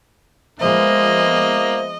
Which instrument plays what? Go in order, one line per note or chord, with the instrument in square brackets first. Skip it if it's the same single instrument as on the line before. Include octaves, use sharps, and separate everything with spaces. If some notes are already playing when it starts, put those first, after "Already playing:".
[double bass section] F3 G#3 B3 [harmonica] A#3 [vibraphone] C5 E5 [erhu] D#5